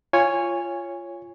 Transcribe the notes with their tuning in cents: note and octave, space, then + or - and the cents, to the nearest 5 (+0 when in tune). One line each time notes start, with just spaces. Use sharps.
F4 -15 C#5 +0 G#5 -15